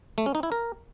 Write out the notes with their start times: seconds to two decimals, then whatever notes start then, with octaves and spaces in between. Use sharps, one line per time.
0.18 A3
0.26 C#4
0.35 D#4
0.43 E4
0.52 A#4